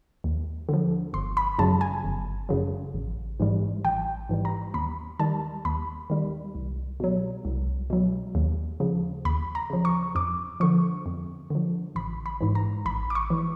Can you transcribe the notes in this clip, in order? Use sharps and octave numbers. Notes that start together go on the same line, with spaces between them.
D#2
D3 F3
G1 C6
B5
F#2 C#3 F#3 A5
G#5
G1
F#2 C#3 F#3
A1
G#2 E3 G3
A1 G5
G#2 E3 G3
A#5
D#2 B5
D#3 G3 A5
D#2 B5
D#3 G3
C2
B2 F#3
C2
B2 F#3
D#2
C#3 F3
D#2 B5
A#5
C#3 F3
C#6
F2 D6
D3 F3 C#6
F2
D3 F3
A1 B5
B5
G#2 E3
A#5
A1 B5
D6
C#6
E3